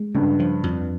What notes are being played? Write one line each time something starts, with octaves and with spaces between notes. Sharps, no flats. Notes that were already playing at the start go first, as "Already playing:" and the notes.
Already playing: G#3
G2 C#3
F3
F2